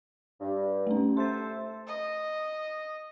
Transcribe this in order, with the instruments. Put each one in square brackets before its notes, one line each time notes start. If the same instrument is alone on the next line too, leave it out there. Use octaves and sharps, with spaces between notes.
[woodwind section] G2
[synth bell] A3 C#4
[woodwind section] A4 C5 E5 [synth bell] C6 A6
[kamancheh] D#5